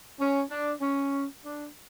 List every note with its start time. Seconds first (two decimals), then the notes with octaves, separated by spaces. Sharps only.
0.20 C#4
0.50 D4
0.81 C#4
1.44 D4